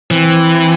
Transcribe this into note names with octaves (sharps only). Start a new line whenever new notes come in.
E3 C4